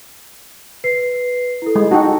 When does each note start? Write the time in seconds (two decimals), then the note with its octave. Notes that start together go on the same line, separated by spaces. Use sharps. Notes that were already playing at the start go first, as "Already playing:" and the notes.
0.84 B4 C7
1.62 E4 A4
1.75 G#3
1.91 D#4 F#4 G5 A5